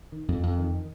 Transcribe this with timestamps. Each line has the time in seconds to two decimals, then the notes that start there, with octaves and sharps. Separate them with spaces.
0.12 D#3
0.28 F2
0.43 F2
0.58 D#3